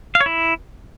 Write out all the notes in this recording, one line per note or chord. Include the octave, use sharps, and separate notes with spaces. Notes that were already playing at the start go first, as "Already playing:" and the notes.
F5
C#5
E4